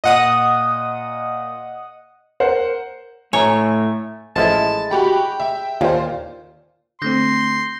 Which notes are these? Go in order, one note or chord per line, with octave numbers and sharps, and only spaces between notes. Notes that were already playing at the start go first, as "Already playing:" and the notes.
A#2 D#5 F#5 D#6
A#4 C5 F#5
A2 A3 C#5 G#5 A#5
A1 F3 G#3 E4 A5
F#4 G4 G5 B5
E5
D#2 A#2 F4 C5
D3 A3 C4 C6 G6 A#6